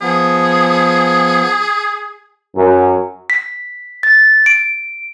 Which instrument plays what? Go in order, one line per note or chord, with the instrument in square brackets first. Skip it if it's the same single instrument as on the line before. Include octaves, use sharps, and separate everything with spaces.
[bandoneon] F3 B3 [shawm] G#4
[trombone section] F#2
[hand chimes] B6
A6
D7